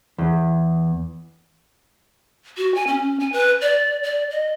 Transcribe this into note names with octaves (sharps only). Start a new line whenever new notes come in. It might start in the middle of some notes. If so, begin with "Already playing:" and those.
E2
F#4
G#5
C#4
G#5
B4
D5
D5
D#5